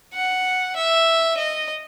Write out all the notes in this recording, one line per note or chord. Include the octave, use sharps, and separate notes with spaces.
F#5
E5
D#5